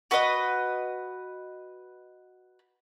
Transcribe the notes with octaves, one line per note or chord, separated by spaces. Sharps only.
F#4 B4 D#5